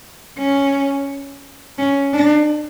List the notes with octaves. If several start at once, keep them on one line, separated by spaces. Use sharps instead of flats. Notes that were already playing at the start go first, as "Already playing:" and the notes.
C#4
C#4
D4